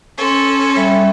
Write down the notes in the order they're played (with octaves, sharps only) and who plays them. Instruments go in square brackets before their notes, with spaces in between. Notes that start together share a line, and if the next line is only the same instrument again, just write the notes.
[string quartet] C#4 A4 [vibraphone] C6 C#6
[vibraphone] G3 E5 B5